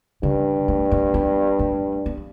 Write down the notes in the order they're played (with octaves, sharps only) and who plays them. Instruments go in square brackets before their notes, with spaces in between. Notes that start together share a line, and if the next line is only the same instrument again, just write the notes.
[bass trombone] G2 [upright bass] C#3
[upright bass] A3
A3
B3
A3
B3